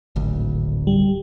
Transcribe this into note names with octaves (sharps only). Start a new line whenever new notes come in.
D1 G#1 D2
G3